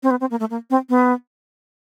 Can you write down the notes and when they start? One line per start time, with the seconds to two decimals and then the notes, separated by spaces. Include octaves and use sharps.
0.03 C4
0.10 B3
0.20 C4
0.31 A#3
0.40 A3
0.50 A#3
0.70 C4
0.89 B3